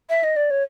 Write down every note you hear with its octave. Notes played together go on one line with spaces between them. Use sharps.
E5
D#5
D5
C#5